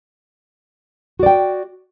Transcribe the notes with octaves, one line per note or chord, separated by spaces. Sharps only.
F#4 D5 G5